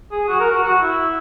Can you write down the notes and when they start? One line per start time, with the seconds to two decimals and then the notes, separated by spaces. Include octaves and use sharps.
0.11 G#4
0.28 F#4
0.40 A#4
0.52 F#4
0.63 F#4
0.82 E4